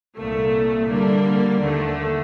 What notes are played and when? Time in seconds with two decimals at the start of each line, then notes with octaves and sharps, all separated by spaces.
0.14 C2 A#2 A3
0.87 D3 G3 A#3 D4
1.59 D#2 D3 A3